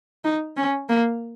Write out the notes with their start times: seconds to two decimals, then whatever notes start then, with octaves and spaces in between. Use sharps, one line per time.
0.24 D#4
0.56 C#4
0.89 A#3